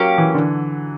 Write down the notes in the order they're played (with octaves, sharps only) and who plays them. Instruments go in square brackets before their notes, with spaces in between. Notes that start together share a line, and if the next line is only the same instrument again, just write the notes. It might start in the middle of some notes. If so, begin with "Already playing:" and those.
Already playing: [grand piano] F#3 [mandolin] A#3 C#4 G4
[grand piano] E3
D3